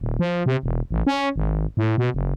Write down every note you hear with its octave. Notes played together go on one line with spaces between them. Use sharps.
D#1
F3
C3
E1
A1
C#4
G#1
A2
B2
F#1